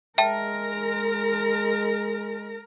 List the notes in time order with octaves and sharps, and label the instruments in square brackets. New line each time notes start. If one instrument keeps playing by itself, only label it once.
[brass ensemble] G#3 [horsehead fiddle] A#4 A#5 [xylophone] E5 G5 A5